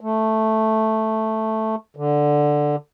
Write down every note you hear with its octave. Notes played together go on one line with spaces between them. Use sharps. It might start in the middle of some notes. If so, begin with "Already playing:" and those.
A3
D3